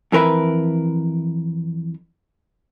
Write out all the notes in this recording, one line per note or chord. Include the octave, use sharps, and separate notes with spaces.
F2 E3 A#4 B4 E5